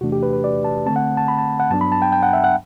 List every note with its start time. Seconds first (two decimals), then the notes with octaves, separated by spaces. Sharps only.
0.01 E2 C3 E3 A3 D4 F#4
0.12 G4
0.23 B4
0.33 B4
0.44 D5
0.65 A5
0.86 D3 A3 C4 A5
0.96 F#5
1.17 A5
1.28 B5
1.38 A5
1.60 F#5
1.70 G2 F#3 B3 D4 A5
1.81 B5
1.92 A5
2.02 G5
2.12 G5
2.23 F#5
2.33 E5
2.44 F#5